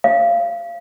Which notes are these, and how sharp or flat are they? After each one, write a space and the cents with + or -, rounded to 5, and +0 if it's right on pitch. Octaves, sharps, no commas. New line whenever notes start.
F5 -25